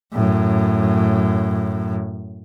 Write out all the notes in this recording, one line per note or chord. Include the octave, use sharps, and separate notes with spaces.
F#2 A2